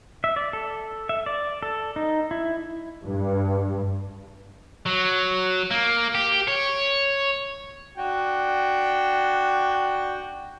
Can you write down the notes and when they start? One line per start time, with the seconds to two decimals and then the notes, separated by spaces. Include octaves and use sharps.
0.24 E5
0.36 D5
0.53 A4
1.09 E5
1.26 D5
1.62 A4
1.96 D#4
2.31 E4
3.05 G2
4.86 F#3
5.71 A#3
6.15 G4
6.48 C#5
7.98 D4 F#4 G5